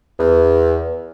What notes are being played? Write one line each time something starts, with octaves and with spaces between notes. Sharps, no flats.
E2